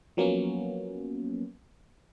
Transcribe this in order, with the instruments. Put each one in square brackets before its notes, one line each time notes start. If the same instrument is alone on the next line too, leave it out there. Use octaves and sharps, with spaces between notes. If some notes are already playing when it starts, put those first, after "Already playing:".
[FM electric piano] F3 F#3 A#3 B3 C#4